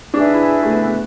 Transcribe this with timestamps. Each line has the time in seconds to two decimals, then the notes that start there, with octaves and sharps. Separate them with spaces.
0.13 D4 G#4 B4 E5 G#5
0.33 E4
0.63 A3
0.72 B3
0.83 B3